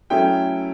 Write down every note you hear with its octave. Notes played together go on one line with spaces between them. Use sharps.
F#3 A3 C#4 E4 G5